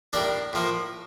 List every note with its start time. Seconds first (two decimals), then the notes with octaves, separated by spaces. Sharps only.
0.13 A2 G3 A#3 D4 D5
0.53 A2 F3 A#3